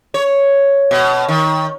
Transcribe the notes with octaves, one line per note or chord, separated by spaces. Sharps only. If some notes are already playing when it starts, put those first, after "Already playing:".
C#5
B2
D#3